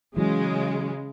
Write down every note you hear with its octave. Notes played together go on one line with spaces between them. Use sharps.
C#3 E3 F#3 G#3